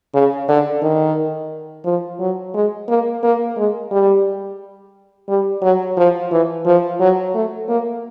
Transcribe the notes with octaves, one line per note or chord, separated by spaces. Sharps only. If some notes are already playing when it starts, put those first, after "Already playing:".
C#3
D3
D#3
F3
F#3
G#3
A#3
A#3
G#3
G3
G3
F#3
F3
E3
F3
F#3
A3
A#3